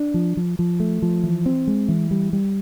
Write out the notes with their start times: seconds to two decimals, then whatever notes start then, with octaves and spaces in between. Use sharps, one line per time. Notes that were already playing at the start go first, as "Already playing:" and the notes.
Already playing: D4
0.14 F3
0.37 F3
0.59 F3
0.80 A3
1.02 F3
1.24 E3
1.46 C4
1.67 G#3
1.88 E3
2.11 G3
2.33 G3